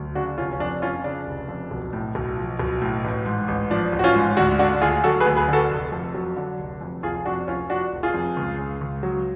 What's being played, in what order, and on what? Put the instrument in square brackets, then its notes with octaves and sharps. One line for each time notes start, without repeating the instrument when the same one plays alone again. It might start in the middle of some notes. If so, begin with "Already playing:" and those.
Already playing: [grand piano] D2 F#3
C#3 D4 F#4
F1 C#4 F4
C#4
F2 D4
F3 C#4 F4
C#3 D4
F1
F2
B1
A2
B1
F3
B1
A2
A1
G#2
A1
F3 D4
A1
F#4
C#4 F4
G#2
D2 D4 F#4
D3 D4 F#4
D2 F4 G#4
F#3 F#4 A4
G#4 B4
D2
G#4 B4
D3
F#4 A4
F1
F2
F#3
D3
F1
F2
F1 F4 G#4
F2 D4 F#4
F1 C#4 F4
F3 D4 F#4
F1
F4 G#4
F2
C#2
C#3
C#2
F#3